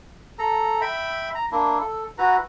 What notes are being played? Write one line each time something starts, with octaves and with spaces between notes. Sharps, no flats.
A4 A#5
E5 G5 B5
A#5
A#3 D4 E4
A4
E4 F#4 B4 A#5